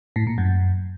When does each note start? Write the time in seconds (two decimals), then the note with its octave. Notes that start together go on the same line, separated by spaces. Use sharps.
0.16 A2
0.27 A#2
0.38 F#2